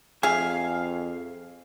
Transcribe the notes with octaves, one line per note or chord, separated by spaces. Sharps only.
F2 G#4 E5 F5 G#5